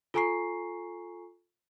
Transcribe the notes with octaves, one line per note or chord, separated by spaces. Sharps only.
F4 A4 G#5 A#5 C#6 C7